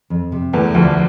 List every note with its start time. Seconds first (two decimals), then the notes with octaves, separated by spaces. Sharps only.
0.10 F2
0.32 C3
0.53 E2 E3 A3
0.74 D2 D3 F3